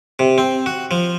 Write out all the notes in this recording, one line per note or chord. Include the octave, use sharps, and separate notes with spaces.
C3
C4
F#4
F3